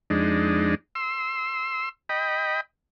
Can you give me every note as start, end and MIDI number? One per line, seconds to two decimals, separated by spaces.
0.10 0.75 41
0.10 0.75 56
0.10 0.75 62
0.10 0.75 63
0.95 1.89 84
0.95 1.89 88
2.09 2.61 75
2.09 2.61 79
2.09 2.61 83